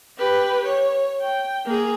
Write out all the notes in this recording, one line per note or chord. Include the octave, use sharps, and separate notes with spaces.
G4 B4
C#5
G5
A#3 G#4